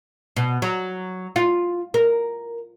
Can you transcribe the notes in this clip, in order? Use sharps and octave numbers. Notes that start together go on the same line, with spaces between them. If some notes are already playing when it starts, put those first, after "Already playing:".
B2
F#3
F4
A#4